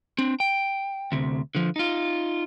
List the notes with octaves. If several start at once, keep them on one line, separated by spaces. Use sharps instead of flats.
C4 D4
G5
D2 C3
D3 F3
D#4 F4